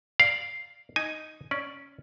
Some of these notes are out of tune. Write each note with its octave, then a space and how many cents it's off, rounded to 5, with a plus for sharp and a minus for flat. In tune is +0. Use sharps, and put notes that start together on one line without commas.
D5 +0 F5 +0 A#5 +0
D#4 +0 G#5 +0
C#4 +5 D5 +0